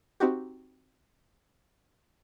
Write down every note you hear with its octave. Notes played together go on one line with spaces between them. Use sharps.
C4 D#4 F#4 G4